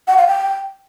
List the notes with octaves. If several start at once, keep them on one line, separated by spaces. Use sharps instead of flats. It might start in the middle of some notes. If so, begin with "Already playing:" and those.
F#5
F5
G5